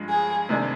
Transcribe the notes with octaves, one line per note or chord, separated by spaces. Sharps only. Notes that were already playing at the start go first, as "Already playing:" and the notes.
Already playing: G2 F3 G#3
G#4
C3 D#3 G#3 D4